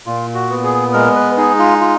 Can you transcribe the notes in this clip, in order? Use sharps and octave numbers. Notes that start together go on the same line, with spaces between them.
A#2 F4
F#4
B3
G#4
G#3 A#4
B4
D#4 G#4
F4
F4